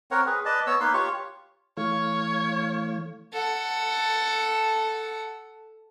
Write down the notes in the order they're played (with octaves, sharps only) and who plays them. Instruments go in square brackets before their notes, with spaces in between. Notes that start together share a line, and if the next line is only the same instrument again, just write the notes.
[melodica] C4 A#4 C#5 F#5
G#4 B4
B4 D5 D#5 A5
B3 C#5 E6
A#3 D#4 B4 C6
F4 G4 C#5 C#6
[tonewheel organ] E3 A3 F5 [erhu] C#5
[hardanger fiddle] A4 F#5